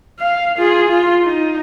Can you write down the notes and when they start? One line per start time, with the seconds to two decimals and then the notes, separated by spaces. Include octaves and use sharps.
0.19 F5
0.57 F4 G#4
0.88 F4
1.23 D#4